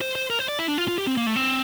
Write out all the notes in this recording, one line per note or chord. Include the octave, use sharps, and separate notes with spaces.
C5
C5
A#4
C5
D5
E4
D4
F4
F4
G4
C4
A#3
A3
C4